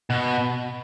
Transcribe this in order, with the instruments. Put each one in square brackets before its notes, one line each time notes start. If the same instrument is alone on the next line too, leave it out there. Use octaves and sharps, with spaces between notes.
[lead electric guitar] B2